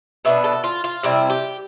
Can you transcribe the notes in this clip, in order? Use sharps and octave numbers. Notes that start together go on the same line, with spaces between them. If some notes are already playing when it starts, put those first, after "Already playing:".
B2 B3 D4 E5
A4
F4
F4
C3 G3 C4 E4
G4